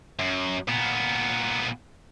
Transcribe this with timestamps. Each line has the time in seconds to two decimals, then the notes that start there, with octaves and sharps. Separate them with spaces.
0.20 F#2
0.68 A#2 B3